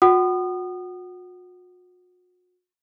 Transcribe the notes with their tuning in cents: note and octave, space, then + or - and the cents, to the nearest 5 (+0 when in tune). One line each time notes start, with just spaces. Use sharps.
F#4 -45 F#5 +35 D#6 -30